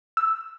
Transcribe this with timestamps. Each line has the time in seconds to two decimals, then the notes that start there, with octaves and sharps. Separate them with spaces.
0.17 E6